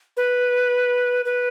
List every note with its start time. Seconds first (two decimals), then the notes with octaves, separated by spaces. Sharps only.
0.17 B4
1.25 B4